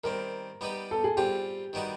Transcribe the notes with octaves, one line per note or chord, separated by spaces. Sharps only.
D#3 G3 C4 A#4
G3 B3 D#4 G4 B4
A4
G#4
G3 C4 F4 G4
D#3 G3 B3 D#4 F#4